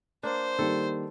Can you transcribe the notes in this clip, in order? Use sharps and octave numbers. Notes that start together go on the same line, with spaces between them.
A#3 D4 C5
D#3 G3 A#3 A4